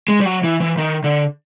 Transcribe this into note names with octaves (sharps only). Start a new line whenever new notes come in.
G#3
G3
F#3
E3
E3
D#3
D3